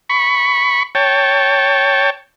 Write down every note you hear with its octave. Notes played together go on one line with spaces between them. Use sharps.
B5 C#6
C#5 G5 A5